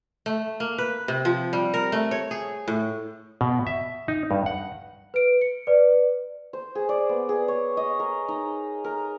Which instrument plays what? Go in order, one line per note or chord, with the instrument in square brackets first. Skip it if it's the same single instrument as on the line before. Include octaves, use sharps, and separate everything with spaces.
[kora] A3
A#3
B4
C3
F3
G3
A#4
A3
C#5
G#4
A2
[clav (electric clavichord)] B2
E5
D#4
G2
F#5
[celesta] B4 D7
C#7
B4 D5
[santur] C5
G#4
D5
B3
G#4
C#5
D#5
A#4
D#4
A#4